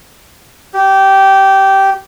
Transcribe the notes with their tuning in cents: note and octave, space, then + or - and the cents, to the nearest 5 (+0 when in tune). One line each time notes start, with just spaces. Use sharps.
G4 -15